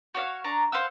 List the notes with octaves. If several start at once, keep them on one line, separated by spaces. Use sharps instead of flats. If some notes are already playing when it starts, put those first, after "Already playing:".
F#4 C#5 D5 F5
D4 A#5 C#6
C5 F5 F#5 E6